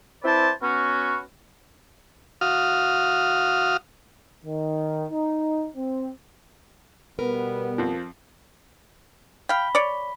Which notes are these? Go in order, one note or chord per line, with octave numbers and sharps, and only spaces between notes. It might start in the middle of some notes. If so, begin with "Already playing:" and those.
C4 E4 B4 C5 D5 A5
B3 C#4 F#4
F#4 F5 D#6 F6
D#3
D#4
C4
B2 G3 B3 A#4 B4
F2 F3
F5 G5 B5 B6 G7
C#5 D5